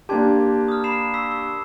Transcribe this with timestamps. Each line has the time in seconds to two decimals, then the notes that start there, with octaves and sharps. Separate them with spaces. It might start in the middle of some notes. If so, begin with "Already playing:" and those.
0.09 A#3 D4 G4 A5 C6 G#6
0.68 D#6 F6
0.84 B5 C7 E7
1.14 C#6 E6 B6
1.31 C#6 E6